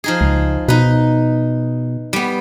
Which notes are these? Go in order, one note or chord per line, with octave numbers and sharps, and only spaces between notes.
F3 D#4 G#4
C#2
B2 D#4 B4
G3 B3